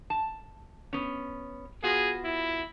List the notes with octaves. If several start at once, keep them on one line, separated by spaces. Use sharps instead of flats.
A5
B3 C#4
B3 F4 F#4 G#4
E4